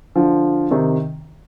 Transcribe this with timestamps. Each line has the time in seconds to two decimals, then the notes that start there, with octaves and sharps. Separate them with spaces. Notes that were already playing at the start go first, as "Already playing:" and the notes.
0.15 D3 F3
0.71 C3 D#3